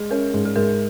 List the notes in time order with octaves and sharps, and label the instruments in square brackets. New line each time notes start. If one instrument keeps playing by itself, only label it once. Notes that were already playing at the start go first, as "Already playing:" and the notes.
Already playing: [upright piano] G#3 [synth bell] G#4
[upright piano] C#4 [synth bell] A#4
[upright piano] G#2
[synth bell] G#4
[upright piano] G#2 [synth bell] A#4